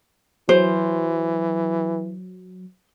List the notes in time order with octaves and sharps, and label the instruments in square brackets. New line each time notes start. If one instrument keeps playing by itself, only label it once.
[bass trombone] E3 [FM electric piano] F#3 [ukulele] C5